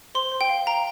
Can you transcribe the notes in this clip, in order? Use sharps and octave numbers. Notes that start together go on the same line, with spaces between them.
C5 C6
C5
G5
F5
F5 A#5